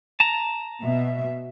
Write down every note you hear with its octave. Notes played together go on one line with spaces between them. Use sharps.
A5 A#5
B2 E5